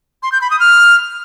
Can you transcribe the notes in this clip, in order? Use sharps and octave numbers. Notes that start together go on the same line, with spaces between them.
C6
G6
B5
D#6
F6